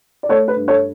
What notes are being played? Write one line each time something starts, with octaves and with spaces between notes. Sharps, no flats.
D5
A3 A4 C#5
B4
G2
A4 C#5